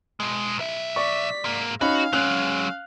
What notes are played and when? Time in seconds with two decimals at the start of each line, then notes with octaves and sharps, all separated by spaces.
0.20 B2 G#3
0.58 B1 E5
0.96 D5 C#6 B6
1.45 G#2 A#3
1.81 C#4 D#4 F#4 F5 B5
2.13 F#3 G#3 C#4 F#6 F7